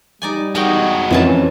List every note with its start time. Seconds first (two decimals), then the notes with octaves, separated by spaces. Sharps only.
0.22 G3 D#4 D5 G#5
0.55 G#3 D#4 F#4 A#4 G5
1.11 F2 A#2 E3 C#4 A5